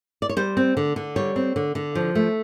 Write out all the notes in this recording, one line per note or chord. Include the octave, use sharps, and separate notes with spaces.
D5
C#5
G3 C5
C4
D3
D3
G3 C#5
C4
D3
D3
F3
A3